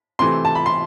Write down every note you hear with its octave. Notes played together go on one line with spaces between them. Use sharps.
C3 E3 A3 C4 C6
A5
B5
C6